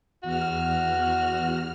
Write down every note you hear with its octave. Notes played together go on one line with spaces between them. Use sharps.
E2 F#4 F6